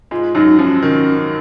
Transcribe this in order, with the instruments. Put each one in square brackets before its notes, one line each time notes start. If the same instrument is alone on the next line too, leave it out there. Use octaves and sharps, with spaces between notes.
[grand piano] G#2 G#3 [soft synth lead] F4
[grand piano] F#2 F#3 [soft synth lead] D#4
[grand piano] F3 [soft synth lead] C#4
[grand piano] D#3 [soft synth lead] C#4